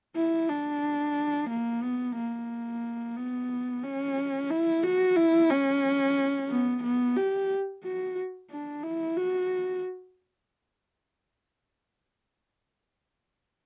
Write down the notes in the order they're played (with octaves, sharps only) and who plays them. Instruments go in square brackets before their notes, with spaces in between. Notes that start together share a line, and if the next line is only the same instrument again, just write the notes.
[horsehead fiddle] E4
D4
A#3
B3
A#3
B3
C#4
E4
F#4
E4
C#4
B3
B3
G4
F#4
D4
E4
F#4